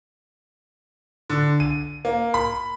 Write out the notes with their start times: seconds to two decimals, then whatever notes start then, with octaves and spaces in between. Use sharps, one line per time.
1.30 D3
1.60 D#7
2.05 A#3
2.34 B5